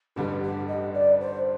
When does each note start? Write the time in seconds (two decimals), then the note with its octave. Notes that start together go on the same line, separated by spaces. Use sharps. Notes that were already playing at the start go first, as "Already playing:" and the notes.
0.16 A1 G2 D3 G3 G4
0.43 G4
0.68 D#5
0.94 D5
1.20 C5